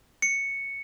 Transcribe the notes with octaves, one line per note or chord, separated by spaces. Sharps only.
C#7